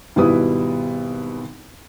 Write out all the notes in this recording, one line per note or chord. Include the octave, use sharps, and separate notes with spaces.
G#1 B2 G3 E4 B4 D#6